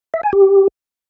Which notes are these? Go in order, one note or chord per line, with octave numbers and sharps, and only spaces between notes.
E5
G#5
G4